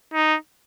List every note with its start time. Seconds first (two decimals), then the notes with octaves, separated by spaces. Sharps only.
0.14 D#4